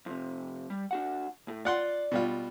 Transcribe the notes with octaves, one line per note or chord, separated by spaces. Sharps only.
F2 C3
G3
D4 F#4 F#5
A2
F4 D5 F#5 C6
B2 G3 F4